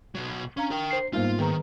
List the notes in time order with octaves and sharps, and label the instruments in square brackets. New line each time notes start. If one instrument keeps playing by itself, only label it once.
[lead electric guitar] B2 F#3
[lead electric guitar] C#4 [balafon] D4 F5 A#5
[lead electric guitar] A#4 G5
[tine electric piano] C5 C7
[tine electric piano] G#2 A#3 D#4 [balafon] G3 B3 C5 [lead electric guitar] F4
[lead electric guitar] D#3 [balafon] G#4 B4 A#5